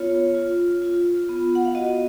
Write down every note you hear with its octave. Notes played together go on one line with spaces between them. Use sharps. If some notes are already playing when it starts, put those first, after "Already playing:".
Already playing: B3 F4 C#5
F4
F4
B3
F#5
F5
F#4 D#5